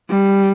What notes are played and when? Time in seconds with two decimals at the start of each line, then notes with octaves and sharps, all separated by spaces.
0.10 G3